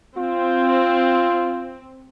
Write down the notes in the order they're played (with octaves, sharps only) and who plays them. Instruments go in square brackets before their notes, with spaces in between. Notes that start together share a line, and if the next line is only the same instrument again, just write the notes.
[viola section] C4 [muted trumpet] F4